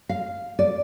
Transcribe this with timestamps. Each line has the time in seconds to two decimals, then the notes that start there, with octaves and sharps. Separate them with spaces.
0.09 F5
0.59 D5